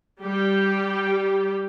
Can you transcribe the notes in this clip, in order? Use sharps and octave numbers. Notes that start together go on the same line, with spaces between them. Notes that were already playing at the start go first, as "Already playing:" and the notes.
G3 G4